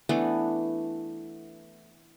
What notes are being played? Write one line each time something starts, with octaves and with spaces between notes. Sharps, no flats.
E3 A3 B3 D4